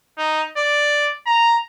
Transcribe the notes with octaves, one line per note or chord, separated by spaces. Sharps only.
D#4
D5
A#5